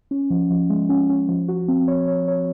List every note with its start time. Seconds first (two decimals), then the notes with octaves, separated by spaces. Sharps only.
0.11 C#4
0.30 F3
0.50 F3
0.70 G#3
0.89 C#4
1.09 C#4
1.29 F3
1.48 F#4
1.68 C4
1.88 C#5
2.07 C#5
2.28 C#5